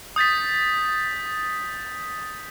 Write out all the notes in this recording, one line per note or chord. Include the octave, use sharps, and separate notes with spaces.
D#6 G6 A6 B6